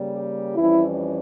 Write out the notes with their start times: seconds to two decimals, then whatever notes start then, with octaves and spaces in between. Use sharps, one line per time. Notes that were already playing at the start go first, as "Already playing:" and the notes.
Already playing: C#3 G3 A#3
0.12 G4
0.55 F2 E3 G3 C#4 E4